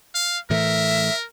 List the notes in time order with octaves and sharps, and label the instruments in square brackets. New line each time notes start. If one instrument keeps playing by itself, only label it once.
[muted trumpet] F5
[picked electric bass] A2 E3 A3 [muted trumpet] A#4 [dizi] E5